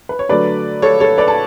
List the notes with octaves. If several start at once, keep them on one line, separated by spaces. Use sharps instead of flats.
B4
C#5
D3 F#3 A3 B4 D5
A4 C#5
A4 C#5
B4 D5
A5